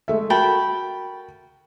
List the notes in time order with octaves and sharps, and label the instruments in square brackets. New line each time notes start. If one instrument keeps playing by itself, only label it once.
[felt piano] G#3 A3 E5
[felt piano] F#4 A#4 [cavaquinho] G5 A5 B5